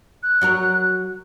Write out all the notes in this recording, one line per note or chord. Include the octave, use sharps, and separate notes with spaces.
F#6
F#3 F#4 A#4